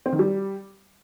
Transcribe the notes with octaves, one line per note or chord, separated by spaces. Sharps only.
C4
D#3
G3